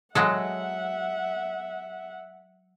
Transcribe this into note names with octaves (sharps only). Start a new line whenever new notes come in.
F#3 G#3 A4 E5 F#5